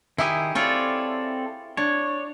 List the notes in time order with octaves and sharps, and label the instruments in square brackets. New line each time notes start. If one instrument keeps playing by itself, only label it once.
[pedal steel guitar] D#3 E5 D#6 [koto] E4 G4 G#4
[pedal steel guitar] C4 A4 D5 [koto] E4 F4 C#5
[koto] D4 [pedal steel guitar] C#5